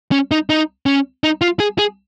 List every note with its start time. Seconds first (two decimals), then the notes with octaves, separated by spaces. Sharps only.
0.12 C#4
0.31 D#4
0.50 D#4
0.86 C#4
1.24 D#4
1.41 F4
1.60 G#4
1.79 G#4